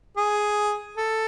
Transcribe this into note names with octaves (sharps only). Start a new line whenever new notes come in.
G#4
A4